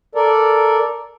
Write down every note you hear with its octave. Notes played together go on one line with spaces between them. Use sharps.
A4 A#4 D5